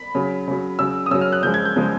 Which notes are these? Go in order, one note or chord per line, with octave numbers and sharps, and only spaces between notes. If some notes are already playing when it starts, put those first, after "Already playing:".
Already playing: B5
C#3 F#3
C#3 F#3
C#3 F#3 E6
D#6
C#3 F#3 E6
F6
F#6
C#3 F3 G#3 G6
G#6
G6
C#3 F3 G#3